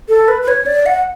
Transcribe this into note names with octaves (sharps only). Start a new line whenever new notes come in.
A4
B4
B4
C#5
D5
F#5